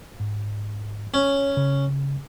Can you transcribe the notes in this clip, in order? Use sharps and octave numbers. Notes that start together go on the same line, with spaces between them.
G#2
C#4 C#5
C#3